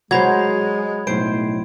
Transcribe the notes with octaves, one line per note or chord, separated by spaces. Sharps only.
F#3 G#3 C5 B5 G#6
B1 A2 C5 D7